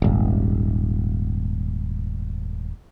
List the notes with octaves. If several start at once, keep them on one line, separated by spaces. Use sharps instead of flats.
D#1 G#1